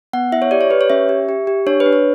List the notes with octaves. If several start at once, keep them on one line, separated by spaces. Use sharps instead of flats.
B3 F#5
E4 E5
C#5
G4 D5
C#5
G4 B4
C#5
C#4 E5
G4
G4
G4
D4 C#5
B4
D4
C#5